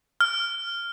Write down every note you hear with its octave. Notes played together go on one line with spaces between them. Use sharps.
F6